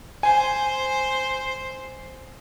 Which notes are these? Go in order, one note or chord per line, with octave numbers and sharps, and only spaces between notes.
C5 G#5